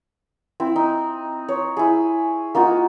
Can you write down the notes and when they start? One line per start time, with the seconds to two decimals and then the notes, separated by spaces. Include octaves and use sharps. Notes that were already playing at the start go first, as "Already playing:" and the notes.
0.60 C4 E4
0.76 D#4
1.48 C#5
1.77 E4 G#4
2.55 A#3 D#4 F4 F#4